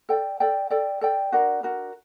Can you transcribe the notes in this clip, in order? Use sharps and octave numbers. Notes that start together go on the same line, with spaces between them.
A4 D5 G5
A4 D5 G5
A4 D5 G5
A4 D5 G5
D4 F#4 A#4
D4 F#4 A#4